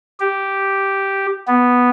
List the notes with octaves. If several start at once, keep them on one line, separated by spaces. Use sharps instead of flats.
G4
B3